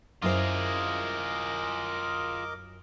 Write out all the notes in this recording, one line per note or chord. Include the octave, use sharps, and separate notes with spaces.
F#2 E4 F4 G#4 A#4 C5 D#5 D6